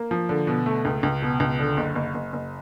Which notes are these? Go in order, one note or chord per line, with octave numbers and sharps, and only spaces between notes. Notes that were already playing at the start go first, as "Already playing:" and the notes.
Already playing: A#3
F3
D3
B2
A3
C#2
C#2
B2
C#2
D3
F#1
F#1
F#1
F#1